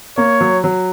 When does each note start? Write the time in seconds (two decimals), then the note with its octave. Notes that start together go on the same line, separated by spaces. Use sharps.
0.18 A#3 C#5
0.41 F#3
0.64 F#3